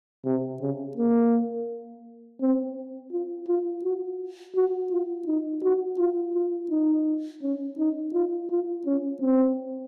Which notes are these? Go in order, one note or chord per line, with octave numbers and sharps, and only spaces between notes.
C3
C#3
A#3
C4
F4
F4
F#4
F#4
F4
D#4
F#4
F4
F4
D#4
C#4
D#4
F4
F4
C#4
C4